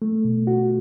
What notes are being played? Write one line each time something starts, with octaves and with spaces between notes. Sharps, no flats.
A3
B2
F#4